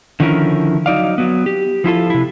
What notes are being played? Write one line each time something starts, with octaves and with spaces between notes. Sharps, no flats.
D3 D#3 F3 C#4 E4 A#4
F#3 D#4 D5 F5
F#3 B3
G4
F3 E4 F4 A4
C3 E4